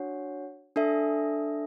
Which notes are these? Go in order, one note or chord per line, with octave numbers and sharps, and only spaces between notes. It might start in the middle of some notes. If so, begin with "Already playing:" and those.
Already playing: D4 F#4 C#5 F#5
D4 A4 E5